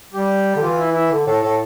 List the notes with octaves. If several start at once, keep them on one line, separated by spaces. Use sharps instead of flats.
G3 G4
D3
E3 F4
E4
E4
D3
A2 A4
A2 A4